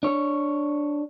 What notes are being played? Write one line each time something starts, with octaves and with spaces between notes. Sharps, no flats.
D4 C#5